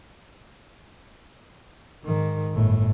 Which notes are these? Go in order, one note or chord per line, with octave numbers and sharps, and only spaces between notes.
G#2 D#3
G1 A2